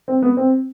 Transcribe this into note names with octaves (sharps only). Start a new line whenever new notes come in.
C4
B3
C4